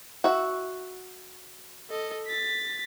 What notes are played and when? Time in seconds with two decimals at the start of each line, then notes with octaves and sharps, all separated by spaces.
0.24 F#4 E5
1.90 A4 D#5
2.27 A6 B6